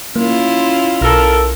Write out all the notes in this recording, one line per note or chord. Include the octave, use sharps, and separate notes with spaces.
A#3 C#4 E4 F4
B1 A4 A#4